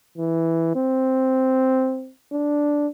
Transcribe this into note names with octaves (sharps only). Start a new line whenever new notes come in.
E3
C4
D4